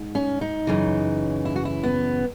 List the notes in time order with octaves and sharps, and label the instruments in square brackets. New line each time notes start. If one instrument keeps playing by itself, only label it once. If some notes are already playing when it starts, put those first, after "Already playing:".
Already playing: [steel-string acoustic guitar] G#2
C#4
D#4
F#2 C#3 E3
E4
F#4
E4
B3